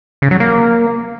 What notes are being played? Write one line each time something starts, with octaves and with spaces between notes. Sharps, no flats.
C#3
F#3
A#3